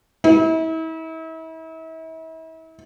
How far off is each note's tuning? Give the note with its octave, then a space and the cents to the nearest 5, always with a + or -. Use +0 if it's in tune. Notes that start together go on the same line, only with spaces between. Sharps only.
E4 -40